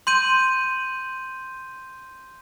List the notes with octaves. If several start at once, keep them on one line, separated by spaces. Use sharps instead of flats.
C6 G6 D#7